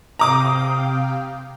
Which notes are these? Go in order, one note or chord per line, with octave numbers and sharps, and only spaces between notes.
C3 F5 G5 A#5 D6 D#6